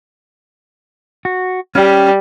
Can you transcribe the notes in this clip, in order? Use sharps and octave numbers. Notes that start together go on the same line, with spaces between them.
F#4
G3 C#4 G4